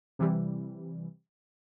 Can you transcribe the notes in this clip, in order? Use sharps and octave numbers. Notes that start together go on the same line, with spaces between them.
C3 E3 G3